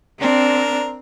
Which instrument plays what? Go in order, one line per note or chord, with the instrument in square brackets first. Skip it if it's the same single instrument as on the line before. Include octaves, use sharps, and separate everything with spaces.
[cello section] C4 [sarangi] D4 [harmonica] A#4